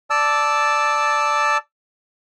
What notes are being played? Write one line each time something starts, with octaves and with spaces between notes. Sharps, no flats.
D5 A5 E6